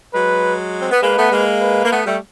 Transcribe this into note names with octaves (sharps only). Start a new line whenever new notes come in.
F#3 G#3 B4
C4
B3
G#3 A#3 B4
A3 B3
G#3 A#3
B4
A#3
A3 B3
G3 A3